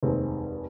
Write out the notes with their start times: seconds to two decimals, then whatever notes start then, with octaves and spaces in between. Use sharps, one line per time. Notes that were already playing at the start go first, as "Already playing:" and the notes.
0.03 F1 D#2 D#3 G#3 C4